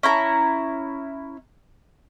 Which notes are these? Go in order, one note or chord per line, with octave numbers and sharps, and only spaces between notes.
C#4 E4 A#5